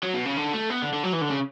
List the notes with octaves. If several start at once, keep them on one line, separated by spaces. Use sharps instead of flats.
F#3
B2
C#3
D3
A3
B3
D3
D3
F#3
E3
D3
C#3